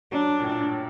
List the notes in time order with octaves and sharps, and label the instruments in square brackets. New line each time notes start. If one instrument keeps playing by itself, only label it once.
[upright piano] F#3 [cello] D4
[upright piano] G2
A#2
A2
G2